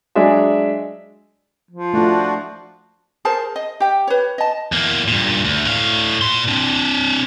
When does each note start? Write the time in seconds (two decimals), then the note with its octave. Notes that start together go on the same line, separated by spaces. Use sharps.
0.15 F#3 G#3 D4 G#4 E5
1.71 F3
1.94 A3 D4 F4 F#4
3.25 G#4 A#4 C5 A5
3.56 D#5
3.80 G4 G5
4.07 B4 C#5
4.38 D#5 A5
4.72 E2 A#3
5.08 G2 A#2
5.45 D2
5.65 A2 F5
6.21 A#2 C6
6.48 C4 D4